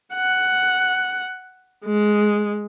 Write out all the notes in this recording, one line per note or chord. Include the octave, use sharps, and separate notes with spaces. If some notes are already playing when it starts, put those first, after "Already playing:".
F#5
G#3